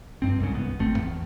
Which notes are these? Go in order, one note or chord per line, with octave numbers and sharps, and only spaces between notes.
F1 G2 C4
C2 G#2 C#3
B3
G#1 A3 C4
E2